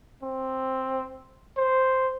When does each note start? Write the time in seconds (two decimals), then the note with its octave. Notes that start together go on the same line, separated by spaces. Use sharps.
0.23 C4
1.57 C5